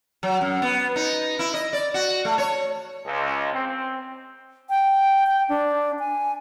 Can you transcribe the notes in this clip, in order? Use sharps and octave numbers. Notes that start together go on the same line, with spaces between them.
F#3
F#2
B3
D#4
E4
D#5
D5
F#4
A3
C#5
C#2
C4
G5
G5
D4
G#5